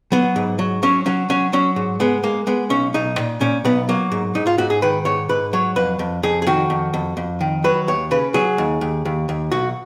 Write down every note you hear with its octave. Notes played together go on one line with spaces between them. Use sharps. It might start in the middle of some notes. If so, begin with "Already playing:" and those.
F#3 B3
G#2
F#3
F#3 C#4
F#3 C#4
F#3 C#4
F#3 C#4
G#2
G#3 B3
G#3 A#3
G#3 B3
B1 C#4
B1 D#4
A#2
A#2 C#4
B1 B3
F#3 A#3
G#2
G#2 D#4
F4
G#2 F#4
G#4
D#3 B4
G#2 C#5
G#2 B4
F#3 C#5
F2 B4
F2
F2 G#4
G#4
D#3 F#4
F2
F2
F2
D#3
F#3 B4
D#2 C#5
C#3 B4
F#3 G#4
D#2
D#2
D#2
D#2
B1 F#4